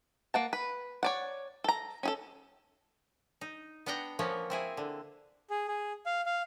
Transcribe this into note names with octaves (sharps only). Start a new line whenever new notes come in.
A#3 F#5 A5
B4
C#5 D5 F#5
A4 A#5
C#4 G#4 A4
D#4
B3 D4 F#5 G5 A#5
F3 A#3 B3 C#4 C#5
C4 E4 G#4
D3
G#4
G#4
F5
F5